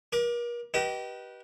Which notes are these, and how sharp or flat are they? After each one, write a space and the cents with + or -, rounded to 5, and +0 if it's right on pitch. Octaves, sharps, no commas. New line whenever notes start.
A#4 +40 D6 +10
G4 -30 B4 -25 D#5 +0